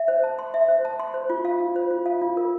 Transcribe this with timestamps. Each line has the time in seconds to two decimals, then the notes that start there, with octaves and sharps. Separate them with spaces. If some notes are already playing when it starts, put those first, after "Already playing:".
Already playing: E5
0.08 C5
0.24 A5
0.39 C6
0.54 E5
0.68 C5
0.85 A5
1.00 C6
1.14 C5
1.30 F4
1.45 F5
1.60 F4
1.76 C5
1.91 F4
2.06 F5
2.21 F4
2.37 A#4